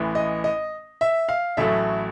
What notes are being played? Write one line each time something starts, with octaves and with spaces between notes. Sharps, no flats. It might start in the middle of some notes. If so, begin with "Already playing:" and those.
Already playing: A1 A2 E3
D#5
D#5
E5
F5
A1 A2 F#3 A3 E5